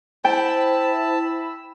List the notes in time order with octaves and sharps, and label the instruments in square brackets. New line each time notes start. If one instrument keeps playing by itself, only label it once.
[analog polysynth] E4 B5 E6 [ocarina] C5 [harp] G5 [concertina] A5